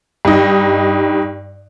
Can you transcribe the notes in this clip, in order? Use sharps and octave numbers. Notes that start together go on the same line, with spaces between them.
G2 D#4